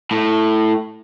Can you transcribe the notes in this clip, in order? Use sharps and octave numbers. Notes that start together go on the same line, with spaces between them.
A2